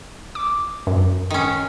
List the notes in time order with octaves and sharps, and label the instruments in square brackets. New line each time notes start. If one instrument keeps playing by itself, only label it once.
[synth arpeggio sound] D6
F#2
[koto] D#3 C#4